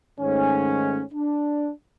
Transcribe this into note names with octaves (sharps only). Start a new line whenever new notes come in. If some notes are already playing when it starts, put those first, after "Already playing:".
G#2 D#3 A3 C#4
D4